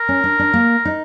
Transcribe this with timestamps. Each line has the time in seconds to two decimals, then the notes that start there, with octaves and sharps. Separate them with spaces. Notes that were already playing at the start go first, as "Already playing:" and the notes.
Already playing: A#4
0.09 C#4
0.24 D4
0.39 D4
0.54 A#3
0.85 D#4